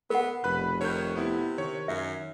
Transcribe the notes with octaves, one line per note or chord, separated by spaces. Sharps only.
B3 A#4 F#5
F1 B2 B4 B5 F#6
D#3 C#5 G6
C3 B3 E4
D#3 C#5
F#2 E5